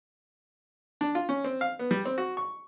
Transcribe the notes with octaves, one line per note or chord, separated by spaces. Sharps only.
D4
F4
C#4
C4
F5
B3
G3
C4
F#4
C#6